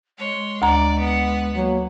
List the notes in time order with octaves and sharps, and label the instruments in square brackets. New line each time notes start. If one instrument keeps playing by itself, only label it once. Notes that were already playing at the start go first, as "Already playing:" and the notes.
[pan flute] G#3 [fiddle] C#5 C6
[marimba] D2 A#5 [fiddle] D5
[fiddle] B3 F#5
[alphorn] F#3 [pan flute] A#3